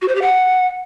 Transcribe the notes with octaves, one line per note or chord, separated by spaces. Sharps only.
F#4
C5
G4
F#5